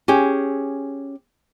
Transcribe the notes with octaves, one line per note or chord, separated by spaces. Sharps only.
C#4 G4 G#4